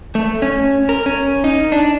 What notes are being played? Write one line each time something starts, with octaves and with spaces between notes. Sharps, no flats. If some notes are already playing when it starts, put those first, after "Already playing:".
A3
C#4
A#4
C#4
D#4
D4